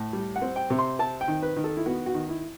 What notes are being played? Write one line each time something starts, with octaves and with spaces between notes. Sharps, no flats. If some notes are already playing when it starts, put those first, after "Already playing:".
Already playing: A2
G3
F#5
C4
G5
C3
C6
C4 A5
G5
D#3
B4
D#3
A4
E4
B3 F#4
F#4
D#3
E4